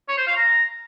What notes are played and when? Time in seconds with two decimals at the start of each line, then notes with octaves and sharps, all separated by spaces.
0.08 C#5
0.18 C5
0.27 F5
0.37 A#5